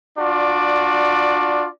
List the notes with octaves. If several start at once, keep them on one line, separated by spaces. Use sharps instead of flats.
D4 F4 F#4 D5